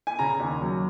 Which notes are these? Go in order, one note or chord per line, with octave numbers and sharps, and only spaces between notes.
G#5
C#3 A#5
D#2
F#3